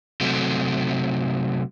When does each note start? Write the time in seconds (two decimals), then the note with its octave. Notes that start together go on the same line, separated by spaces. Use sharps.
0.21 C3 F#3 A3